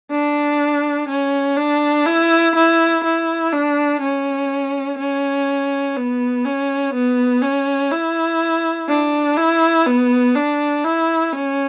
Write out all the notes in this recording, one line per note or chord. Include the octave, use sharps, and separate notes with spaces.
D4
C#4
D4
E4
E4
E4
D4
C#4
C#4
B3
C#4
B3
C#4
E4
D4
E4
B3
D4
E4
C#4